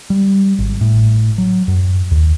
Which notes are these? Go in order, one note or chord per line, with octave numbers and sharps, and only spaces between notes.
G3
G#1
A2
F#3
F#2
D#2